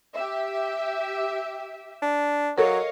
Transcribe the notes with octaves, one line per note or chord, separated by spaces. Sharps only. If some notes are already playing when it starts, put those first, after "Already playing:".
G4 E5
D4
F#3 A4 A#4 C#5 D#5 F5